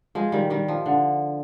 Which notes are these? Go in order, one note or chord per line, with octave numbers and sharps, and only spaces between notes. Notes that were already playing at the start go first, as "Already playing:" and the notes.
F3 G#3
D#3 G3
D#3 G3
F3
D3